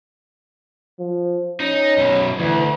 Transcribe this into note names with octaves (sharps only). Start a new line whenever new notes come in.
F3
C#4 D#4
F#2 B2
D2 E3